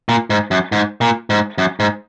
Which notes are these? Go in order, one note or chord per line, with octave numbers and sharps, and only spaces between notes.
A#2
G#2
F#2
G#2
A#2
G#2
F#2
G#2